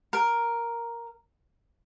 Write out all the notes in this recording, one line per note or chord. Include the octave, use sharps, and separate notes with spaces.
A#4